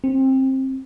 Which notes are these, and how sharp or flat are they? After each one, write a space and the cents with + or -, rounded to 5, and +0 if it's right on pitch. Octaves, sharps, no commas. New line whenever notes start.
C4 +20